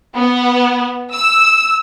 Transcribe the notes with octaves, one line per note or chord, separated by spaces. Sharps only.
B3
E6